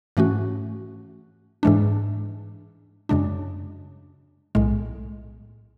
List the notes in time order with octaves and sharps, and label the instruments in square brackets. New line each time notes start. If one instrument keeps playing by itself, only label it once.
[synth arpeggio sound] G#2 E3 A3 C#4 F#4
G#2 E3 G#3 D4
F#2 C#3 G#3 D4
B1 A2 G#3